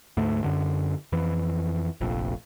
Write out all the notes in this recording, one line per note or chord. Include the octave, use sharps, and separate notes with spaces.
D2 G#2 A3
F#2 D3
F2 E3
F1 A#1 F2